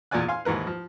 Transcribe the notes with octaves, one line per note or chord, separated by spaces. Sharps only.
E2 A#2 F4 D5 G#5 F#6
F5 G#5 C6 F6
D#2 G#2 E3 A#4 B4
F3